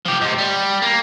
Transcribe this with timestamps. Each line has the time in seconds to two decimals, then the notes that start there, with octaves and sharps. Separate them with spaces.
0.05 F3 G4
0.21 G#2 C3
0.39 G3
0.82 A#3